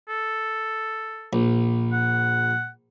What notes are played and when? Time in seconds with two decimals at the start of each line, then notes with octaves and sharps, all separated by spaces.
0.08 A4
1.33 A#1
1.93 F#5